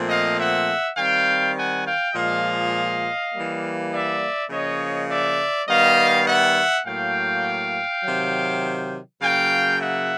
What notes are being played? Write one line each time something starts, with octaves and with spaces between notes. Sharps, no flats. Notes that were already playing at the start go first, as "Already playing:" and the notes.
Already playing: A#2 F3 A3 C4
D#5 F5
E5 F#5
D#3 G3 C4 F5 G5
F#5 G#5
F5 G5
A#2 F3 G#3 D#5 F5
E3 G3 A#3
D5 E5
C#3 F3 A#3 C#5 D#5
D5 E5
D#3 G3 B3 D#5 F5
E5 F#5
A2 F#3 A#3 F5 G5
C3 D#3 F#3
C#3 F#3 A#3 F5 G5
E5 F#5